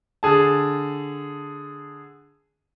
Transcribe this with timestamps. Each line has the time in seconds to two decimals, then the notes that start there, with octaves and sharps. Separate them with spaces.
0.23 D3 G#4 A5